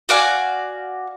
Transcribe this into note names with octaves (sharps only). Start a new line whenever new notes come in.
F#4 D5 F5 G#5